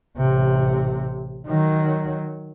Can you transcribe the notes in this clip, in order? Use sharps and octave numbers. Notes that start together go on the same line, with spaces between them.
A1 C3
D#3 F#3